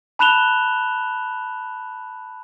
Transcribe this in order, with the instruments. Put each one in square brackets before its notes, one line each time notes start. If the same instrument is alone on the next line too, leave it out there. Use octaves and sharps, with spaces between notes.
[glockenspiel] A5 B5 F#6 E7 F7 G7